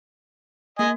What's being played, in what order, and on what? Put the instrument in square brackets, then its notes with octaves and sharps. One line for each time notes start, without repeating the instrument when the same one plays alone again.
[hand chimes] A#3 [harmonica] D#5 G#5